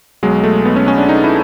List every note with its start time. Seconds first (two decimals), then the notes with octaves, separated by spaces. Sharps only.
0.23 B1 B2 F#3 G#3
0.44 A3
0.65 B3
0.76 C#4
0.88 C#4
0.98 D4
1.09 D#4
1.24 E4